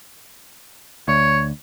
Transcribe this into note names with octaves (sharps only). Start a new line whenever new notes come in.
D2 C#5